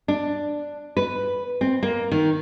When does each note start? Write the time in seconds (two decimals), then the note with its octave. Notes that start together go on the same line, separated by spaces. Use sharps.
0.08 D4
0.97 B4
1.61 C4
1.83 A#3
2.11 D#3